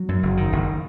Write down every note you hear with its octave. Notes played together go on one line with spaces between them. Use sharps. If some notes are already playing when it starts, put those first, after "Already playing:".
Already playing: F#3
F#2
F#1
D#3
F#1